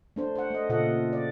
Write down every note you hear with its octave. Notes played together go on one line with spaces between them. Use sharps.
A3 D4 C5
C5 F#5
A3 D#5
A#2 C#3 F4 A4 D#5 F#5
D5